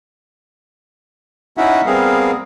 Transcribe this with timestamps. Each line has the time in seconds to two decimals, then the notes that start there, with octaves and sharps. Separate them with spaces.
1.58 C#4 D#4 E4 F#4 E5 F#5
1.86 G3 B3 C4 G#4 A#4 F5